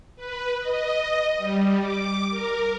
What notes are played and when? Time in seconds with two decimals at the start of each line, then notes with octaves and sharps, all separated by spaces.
0.16 B4
0.60 D#5
1.38 G3
1.79 D6
2.30 A#4